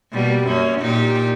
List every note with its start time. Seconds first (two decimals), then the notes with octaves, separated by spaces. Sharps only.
0.12 B2 G3 A#3
0.47 F#2 A#3 C#4
0.80 A#2 D#4 G4